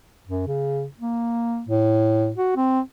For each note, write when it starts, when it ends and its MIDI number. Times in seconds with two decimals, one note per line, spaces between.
0.27 0.47 42
0.47 0.85 49
1.00 1.64 58
1.69 2.31 45
2.36 2.53 66
2.56 2.80 60